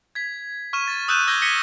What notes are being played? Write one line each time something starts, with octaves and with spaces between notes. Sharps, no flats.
G#6 B6
C#6 F6 D#7 E7
A6
D#6 E6 F#6 G6 D#7 E7
D6 E6 G6 G#6 A#6 G7
G#6 A#6 B6 C#7 D#7 G7